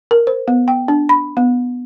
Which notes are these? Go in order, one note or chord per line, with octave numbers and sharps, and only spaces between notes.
A#4
C5
B3
G5
D4
B5
B3